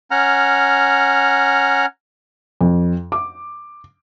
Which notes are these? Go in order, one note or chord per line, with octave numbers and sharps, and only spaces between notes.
C#4 F#5 A#5 F6
F2
D6